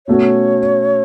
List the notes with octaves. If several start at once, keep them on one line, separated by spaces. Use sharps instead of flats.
B2 A3 C#4 F#4 C#5